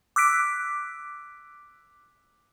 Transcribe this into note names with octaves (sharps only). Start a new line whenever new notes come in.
D6 E6 F#6 B6 D7